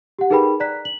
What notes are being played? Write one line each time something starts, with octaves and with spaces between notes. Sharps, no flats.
G4 F#5
D#4 G#4 A#4 B4 G5 B5
D5 A#5 F#6 B6
F#7